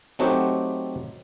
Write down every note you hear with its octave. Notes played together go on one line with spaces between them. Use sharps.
F#3 A3 C4 D#4 F#4 G4